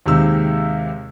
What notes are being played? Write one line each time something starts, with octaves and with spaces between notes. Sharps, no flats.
D#2 C3 G#3 D#4 E6